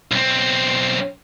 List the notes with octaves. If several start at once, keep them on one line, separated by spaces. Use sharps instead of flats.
B1 C4